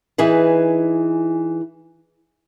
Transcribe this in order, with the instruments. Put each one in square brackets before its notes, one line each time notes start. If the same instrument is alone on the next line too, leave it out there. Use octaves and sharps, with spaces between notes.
[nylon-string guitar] E3 D#4 G#4 B4